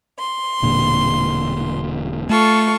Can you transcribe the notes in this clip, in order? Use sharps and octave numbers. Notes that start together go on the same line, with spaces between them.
C6
E1 A#2 D3
A3 F4 A4 C#6